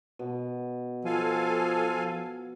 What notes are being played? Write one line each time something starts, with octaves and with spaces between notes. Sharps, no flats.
B2
F3 A4 F5 G#5